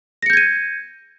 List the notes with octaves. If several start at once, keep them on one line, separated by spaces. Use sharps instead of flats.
G6 G#6 A#6 C#7 D#7